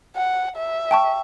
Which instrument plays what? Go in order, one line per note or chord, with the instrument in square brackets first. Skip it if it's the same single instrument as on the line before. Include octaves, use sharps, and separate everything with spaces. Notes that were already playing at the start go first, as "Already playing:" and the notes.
[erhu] F#5
E5
[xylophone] G5 A5 C#6